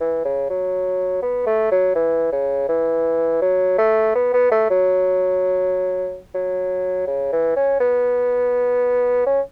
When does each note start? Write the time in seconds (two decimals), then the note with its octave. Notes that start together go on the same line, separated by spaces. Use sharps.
0.01 E3
0.25 C#3
0.50 F#3
1.22 B3
1.46 A3
1.71 F#3
1.96 E3
2.32 C#3
2.69 E3
3.42 F#3
3.78 A3
4.15 B3
4.33 B3
4.51 A3
4.70 F#3
6.35 F#3
7.07 C#3
7.32 E3
7.56 C#4
7.80 B3
9.26 C#4